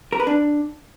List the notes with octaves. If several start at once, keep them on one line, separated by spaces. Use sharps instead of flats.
A#4
B4
D4